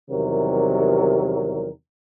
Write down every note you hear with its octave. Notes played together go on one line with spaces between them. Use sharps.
E2 C3 D#3 F#3 G3 A#4